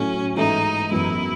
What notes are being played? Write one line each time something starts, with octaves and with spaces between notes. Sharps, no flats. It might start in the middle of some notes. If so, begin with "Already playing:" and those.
Already playing: A2 F#3 A3 C#4
G#2 E3 A3 D#4 E4
F#2 E3 B3 E4